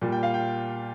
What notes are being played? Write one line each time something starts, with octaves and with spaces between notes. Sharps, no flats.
A#2 G3
G5
F5
G5